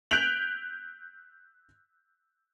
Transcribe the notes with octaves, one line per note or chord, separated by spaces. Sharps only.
F#6 G6 B6 D7 F7 F#7